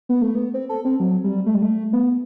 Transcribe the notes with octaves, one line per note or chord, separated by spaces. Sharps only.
B3
A3
B3
C4
A4
C4
F#3
G3
A3
G3
A3
B3